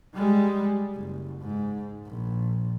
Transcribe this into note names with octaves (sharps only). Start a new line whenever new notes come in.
G3 G#3
F#1
G#2
A#1